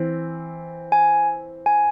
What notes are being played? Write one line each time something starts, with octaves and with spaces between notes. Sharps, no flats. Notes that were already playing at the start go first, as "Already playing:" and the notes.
Already playing: E3 C4
G#5
G#5